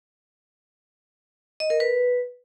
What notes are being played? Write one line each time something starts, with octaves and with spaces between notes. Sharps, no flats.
D#5
A#4
B4